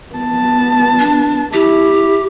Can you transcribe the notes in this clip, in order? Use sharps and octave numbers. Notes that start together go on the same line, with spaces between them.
B3 A5
D4
E4 G4